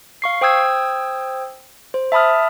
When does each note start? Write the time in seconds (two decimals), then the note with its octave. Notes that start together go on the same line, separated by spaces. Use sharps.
0.22 F5 C#6 C7
0.41 C5 G5 D#6 E6 G#6
1.94 C5
2.12 E5 A5 B5 D#6 F6